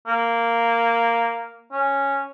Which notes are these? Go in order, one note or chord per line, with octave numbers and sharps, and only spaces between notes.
A#3
C#4